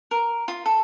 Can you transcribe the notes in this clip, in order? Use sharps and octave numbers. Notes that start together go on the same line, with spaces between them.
A#4
F4
A4